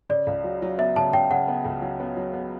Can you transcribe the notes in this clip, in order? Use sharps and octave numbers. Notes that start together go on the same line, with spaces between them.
C#3 D5
C#2
F#3
F#3
B3 E5
C#3 A5
C#3 G5
C#3 F#5
B3
C#2
F#3
B3
F#3
B3